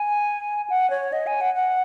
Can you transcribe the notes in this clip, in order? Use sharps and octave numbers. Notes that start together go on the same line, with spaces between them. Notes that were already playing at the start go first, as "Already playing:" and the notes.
Already playing: G#5
F#5
C#5
D#5
G#5
F#5
F#5